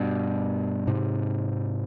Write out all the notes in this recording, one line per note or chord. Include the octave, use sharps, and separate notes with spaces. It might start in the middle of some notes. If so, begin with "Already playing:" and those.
Already playing: G2 B2
G#2 C3